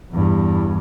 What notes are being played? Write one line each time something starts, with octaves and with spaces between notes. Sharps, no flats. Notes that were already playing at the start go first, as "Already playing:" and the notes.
E2 G2